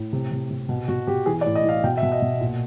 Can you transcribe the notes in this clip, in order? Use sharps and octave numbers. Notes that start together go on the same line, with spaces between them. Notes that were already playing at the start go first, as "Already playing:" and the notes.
Already playing: A2
C3
C3
C3
B2
B2 F#4
B2 G4
E3 G#4
D5
A2
D#5
E3 F5
B2 G5
E5
B2
D#5
B2
A#2